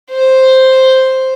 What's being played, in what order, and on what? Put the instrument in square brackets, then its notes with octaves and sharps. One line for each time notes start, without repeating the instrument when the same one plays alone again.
[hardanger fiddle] C5